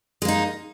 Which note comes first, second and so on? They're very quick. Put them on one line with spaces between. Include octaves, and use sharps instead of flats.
G#3 A#3 D#4